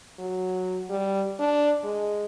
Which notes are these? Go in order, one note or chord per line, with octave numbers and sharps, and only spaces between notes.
F#3
G3
D4
G#3